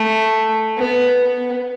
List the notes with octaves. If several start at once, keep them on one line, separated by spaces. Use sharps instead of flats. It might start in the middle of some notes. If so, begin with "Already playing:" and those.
Already playing: A3
B3
B3